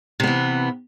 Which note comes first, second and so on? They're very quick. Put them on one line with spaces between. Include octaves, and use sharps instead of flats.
C3 B3 E3